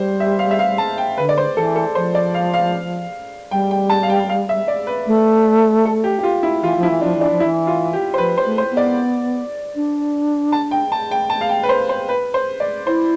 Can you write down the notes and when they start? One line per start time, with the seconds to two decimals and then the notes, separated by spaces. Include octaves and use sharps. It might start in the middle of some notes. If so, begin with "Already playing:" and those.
Already playing: G3 C5
0.20 E5
0.39 F5
0.51 E5
0.59 F5
0.78 A5
0.98 G5
1.18 D3 B4
1.29 D5
1.38 C5
1.57 E3 A4
1.76 A4
1.95 F3 C5
2.15 D5
2.34 F5
2.54 F5
3.51 G3 G5
3.71 G5
3.90 A5
4.03 F5
4.10 G5
4.29 F5
4.49 E5
4.68 D5
4.87 B4
5.06 A3
5.85 A4
6.04 G4
6.19 G4
6.23 F4
6.43 E4
6.62 E3 F4
6.77 F3
6.83 E4
6.90 E3
7.01 F3 D4
7.16 E3 D4
7.30 F3
7.40 E4
7.43 E3
7.67 F4
7.93 G4
8.14 C5
8.18 F3 B4
8.37 C5
8.44 A3
8.58 C5
8.70 B3
8.77 D5
9.75 D4
10.52 A5
10.71 G5
10.92 A5
11.11 G5
11.30 A5
11.41 F5
11.49 G5
11.63 B4
11.69 C5
11.89 C5
12.09 B4
12.34 C5
12.60 D5
12.86 E4 C5